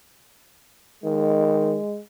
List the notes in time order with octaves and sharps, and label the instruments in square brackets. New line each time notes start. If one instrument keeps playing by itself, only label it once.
[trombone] D#3 [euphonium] G#3